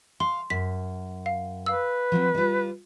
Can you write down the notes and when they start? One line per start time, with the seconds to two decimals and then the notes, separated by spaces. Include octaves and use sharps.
0.20 F5 C6
0.50 F#2 B6
1.26 F5
1.66 B4 F5 E6
2.12 F3 F#3 C4
2.35 G3 F4